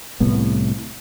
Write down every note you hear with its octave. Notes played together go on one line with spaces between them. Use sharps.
C2 A2 B3